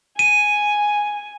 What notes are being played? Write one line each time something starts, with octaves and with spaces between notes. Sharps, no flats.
G#5 D#7